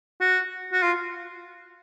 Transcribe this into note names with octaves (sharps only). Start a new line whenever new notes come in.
F#4
F#4
F4